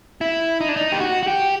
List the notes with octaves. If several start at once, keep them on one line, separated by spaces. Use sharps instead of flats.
E4
D#4
D4
D#4
G4
F#4
F#4
G4